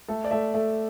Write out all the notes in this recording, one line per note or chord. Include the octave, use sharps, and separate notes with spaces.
A3 A4
D5
A3 E5
A3